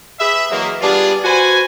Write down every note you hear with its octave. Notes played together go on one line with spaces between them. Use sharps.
G#4 B4 E5
E3 F#3 G#3 A#3
G3 B3 D4 F4 G#4
F#4 B4 C5 G#5